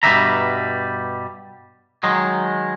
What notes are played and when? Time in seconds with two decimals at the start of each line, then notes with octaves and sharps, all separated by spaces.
0.03 G2 B2 G3 B4 E5 A#5
2.03 D#3 F#3 G#3